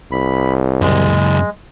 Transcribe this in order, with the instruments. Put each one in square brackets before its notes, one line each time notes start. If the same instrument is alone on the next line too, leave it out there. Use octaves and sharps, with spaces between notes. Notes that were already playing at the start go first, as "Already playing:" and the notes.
[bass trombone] C2 [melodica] B5
[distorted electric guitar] C#2 F#2 [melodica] G#3